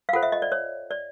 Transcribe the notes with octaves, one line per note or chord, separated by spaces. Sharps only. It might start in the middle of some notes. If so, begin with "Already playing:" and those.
F5
F4 A4 C5 F#5
E5
D#5
D5
C#5
D5